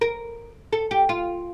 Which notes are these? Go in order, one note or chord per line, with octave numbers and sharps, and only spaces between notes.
A#4
A4
G4
F4